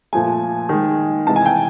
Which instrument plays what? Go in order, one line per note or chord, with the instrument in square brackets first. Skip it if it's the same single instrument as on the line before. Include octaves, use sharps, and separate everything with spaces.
[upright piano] A#2 F3 A3 G#5
D#3 G#3
C3 E3 G#3 A5
G#5
G5